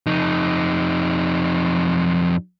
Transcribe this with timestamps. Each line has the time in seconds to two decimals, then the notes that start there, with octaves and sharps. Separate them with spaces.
0.06 F2 D#4